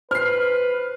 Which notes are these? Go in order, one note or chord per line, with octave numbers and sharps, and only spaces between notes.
B4 C5 F6 C7